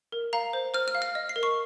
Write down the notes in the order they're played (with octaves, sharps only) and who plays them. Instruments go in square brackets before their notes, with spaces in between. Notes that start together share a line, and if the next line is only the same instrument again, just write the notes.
[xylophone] A#4
F5 A#5
C5
C5 F6
F6
F5
F6
D#5
C7
A#4
C#6